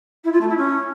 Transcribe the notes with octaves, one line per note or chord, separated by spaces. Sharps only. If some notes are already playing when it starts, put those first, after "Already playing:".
E4
F4
A3
E4
C#4